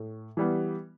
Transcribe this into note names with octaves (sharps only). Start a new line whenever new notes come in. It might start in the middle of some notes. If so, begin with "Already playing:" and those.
Already playing: A2
E3 G3 B3